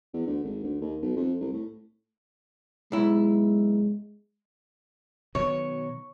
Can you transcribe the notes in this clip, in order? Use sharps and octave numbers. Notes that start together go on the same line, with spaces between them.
E2
D2
G#1
D2
D#2
B1
F2
C2
A2
B1 G#3 E4
B2 D#3 F#3 C#5